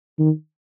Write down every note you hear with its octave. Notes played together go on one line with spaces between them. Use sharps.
D#3